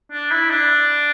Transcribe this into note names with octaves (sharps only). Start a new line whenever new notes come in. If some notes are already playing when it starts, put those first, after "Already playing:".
D4
E4
D4